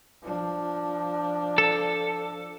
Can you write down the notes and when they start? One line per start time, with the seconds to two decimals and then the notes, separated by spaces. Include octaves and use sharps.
0.22 F3 D4
1.58 A4